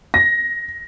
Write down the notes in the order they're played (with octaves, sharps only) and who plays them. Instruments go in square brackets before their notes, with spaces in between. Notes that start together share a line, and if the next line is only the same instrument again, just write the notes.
[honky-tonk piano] A#6